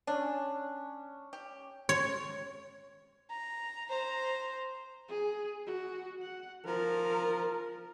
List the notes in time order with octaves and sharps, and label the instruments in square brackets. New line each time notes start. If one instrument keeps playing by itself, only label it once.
[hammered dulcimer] C#4 [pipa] D4
[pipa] G4
[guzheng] C#5
[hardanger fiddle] A#5
C5 A#5
[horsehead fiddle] G#4
F#4
F#5
[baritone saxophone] F3 [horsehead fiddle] A#4